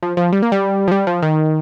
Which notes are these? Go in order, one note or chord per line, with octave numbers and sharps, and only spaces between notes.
F3
F3
G3
A#3
G3
F3
G3
F3
D#3